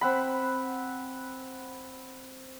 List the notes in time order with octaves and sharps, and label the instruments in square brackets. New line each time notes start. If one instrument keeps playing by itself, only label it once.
[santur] C4 F#5 B5